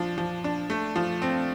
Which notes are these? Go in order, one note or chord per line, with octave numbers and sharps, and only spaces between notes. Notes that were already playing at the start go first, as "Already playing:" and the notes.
Already playing: F3 D4
F3
D4
A3
F3
C4